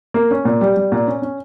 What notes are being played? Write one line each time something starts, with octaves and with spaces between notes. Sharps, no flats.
A#3
C#4
A#2
G3
G3
A#2
C#4
C#4